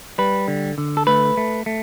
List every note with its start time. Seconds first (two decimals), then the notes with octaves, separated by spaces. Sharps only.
0.18 G3 B4
0.48 D3
0.78 D3
0.97 A4
1.07 A3 B4
1.37 A3
1.66 A3